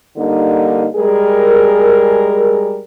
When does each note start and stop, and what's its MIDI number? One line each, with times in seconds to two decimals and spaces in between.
0.17 0.87 50
0.17 0.87 55
0.17 0.87 58
0.17 0.87 63
0.96 2.82 55
0.96 2.82 56
0.96 2.82 68
0.96 2.82 70